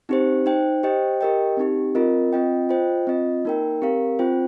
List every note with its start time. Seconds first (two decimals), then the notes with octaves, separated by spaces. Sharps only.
0.09 C4 D#4 G4 C5
0.46 D#4 C5 G5
0.83 G4 C5 D#5 G5
1.21 G4 A#4 D#5 G5
1.57 C4 D#4 G4
1.95 C4 F4 A#4 D#5
2.33 C4 F4 D#5 G5
2.69 F4 C5 D#5 G5
3.07 C4 F4 D#5
3.45 A#3 D#4 A#4 G5
3.82 C4 G4 A#4 F5
4.19 C4 F4 C5 G5